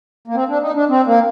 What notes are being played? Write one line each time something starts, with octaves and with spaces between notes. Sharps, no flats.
A#3
C4
D4
D#4
D4
C4
A#3